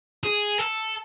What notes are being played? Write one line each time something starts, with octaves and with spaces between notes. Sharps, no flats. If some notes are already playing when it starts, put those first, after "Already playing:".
G#4
A4